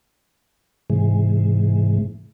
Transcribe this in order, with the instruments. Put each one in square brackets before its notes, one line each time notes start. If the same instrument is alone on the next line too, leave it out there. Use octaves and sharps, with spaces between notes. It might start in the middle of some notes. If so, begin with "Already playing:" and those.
[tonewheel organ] G#2 C3 E3 G#3